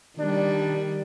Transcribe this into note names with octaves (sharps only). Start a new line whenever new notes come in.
D#3 G3 D4